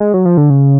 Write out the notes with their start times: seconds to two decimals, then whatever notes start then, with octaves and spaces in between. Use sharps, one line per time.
0.00 G#3
0.14 F#3
0.25 F3
0.37 D3
0.50 C#3